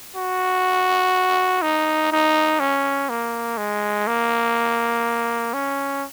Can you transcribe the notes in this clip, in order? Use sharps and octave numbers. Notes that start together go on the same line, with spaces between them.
F#4
D#4
D#4
C#4
A#3
G#3
A#3
C#4